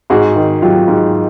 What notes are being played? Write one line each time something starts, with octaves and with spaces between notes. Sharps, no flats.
G#2 F#4 G#4
D#3
F#3 F4 G4
G#2